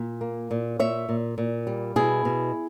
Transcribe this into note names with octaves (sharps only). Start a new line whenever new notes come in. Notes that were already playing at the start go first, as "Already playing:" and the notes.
Already playing: A#2
A#3
A#2
A#2 C#5 E5
A#2
A#2
G3
B2 E4 G#4
B2